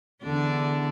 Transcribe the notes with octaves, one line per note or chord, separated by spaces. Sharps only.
E2 D3 D4